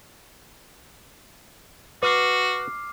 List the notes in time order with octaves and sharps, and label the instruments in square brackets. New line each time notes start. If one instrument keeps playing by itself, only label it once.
[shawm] F#4 [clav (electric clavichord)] B4 [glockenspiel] D6 F6 C7